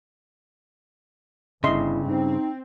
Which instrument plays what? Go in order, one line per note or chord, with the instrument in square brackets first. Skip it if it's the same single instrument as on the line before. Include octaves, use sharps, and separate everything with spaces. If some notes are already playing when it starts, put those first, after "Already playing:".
[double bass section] G1 [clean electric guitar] G2 C#3 [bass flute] E4 [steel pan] D#5 E5 C6
[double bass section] C4 [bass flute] D#4